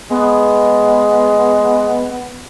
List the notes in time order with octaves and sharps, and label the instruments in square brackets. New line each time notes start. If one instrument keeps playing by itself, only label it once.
[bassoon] G#3 [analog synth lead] B3